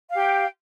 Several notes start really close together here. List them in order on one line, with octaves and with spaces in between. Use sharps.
F5 G4 G5